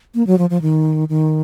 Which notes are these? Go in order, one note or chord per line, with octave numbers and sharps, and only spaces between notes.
A#3
F#3
F3
F3
D#3
D#3